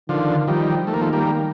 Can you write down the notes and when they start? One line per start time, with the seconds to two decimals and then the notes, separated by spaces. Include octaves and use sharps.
0.09 D3 D#3 F3
0.47 D#3 F3 G3
0.87 D#3 A3
0.94 A#3
1.01 F3 A3
1.13 G3 A#3